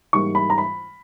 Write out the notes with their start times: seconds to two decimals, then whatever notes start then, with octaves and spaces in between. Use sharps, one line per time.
0.13 G#2 E3 G3 A#3 C#6
0.35 B5
0.50 A#5
0.58 B5